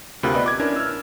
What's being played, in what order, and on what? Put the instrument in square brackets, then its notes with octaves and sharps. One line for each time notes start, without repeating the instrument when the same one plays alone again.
[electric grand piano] D2 C3 F4 A#4 B5 F#6
B3 B4 D5 D#5 B5
D6 G#6
C#4 D4 E4 A#4
E6 F6